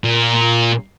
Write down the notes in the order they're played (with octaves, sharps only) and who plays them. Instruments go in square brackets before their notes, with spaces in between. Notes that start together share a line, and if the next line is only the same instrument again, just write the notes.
[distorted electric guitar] A#2